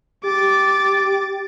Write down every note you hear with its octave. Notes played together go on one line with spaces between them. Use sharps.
G4 D6 A6